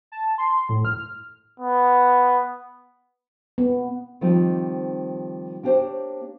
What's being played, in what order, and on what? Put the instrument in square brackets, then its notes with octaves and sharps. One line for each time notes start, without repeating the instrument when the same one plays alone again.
[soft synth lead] A5
C6
A2
F6
[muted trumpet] B3
[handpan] B3
[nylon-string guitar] D#3 F3 G3 A#3 C4 D#4
A#3 D4 G4 A4 C5 C#5